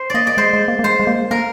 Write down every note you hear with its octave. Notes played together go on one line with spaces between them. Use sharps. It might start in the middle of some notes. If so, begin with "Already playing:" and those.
Already playing: C5
A#3 D5 D#5
D5
G#3 C5
G#3
A#3
A#3
G#3 C5
G#3
A#3
A#3 A#4